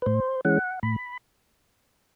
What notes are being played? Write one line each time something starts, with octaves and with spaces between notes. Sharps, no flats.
B4
A2 C5
E3 G#3 C#4 F#5
A2 B5